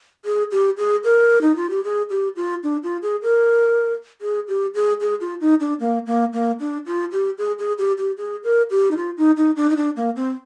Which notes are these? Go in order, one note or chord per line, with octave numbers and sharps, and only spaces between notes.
G#4
G4
G#4
A#4
D#4
F4
G4
G#4
G4
F4
D4
F4
G#4
A#4
G#4
G4
G#4
G#4
F4
D#4
D4
A#3
A#3
A#3
D4
F4
G4
G#4
G#4
G4
G4
G#4
A#4
G4
D#4
F4
D#4
D#4
D4
D#4
D4
A#3
C4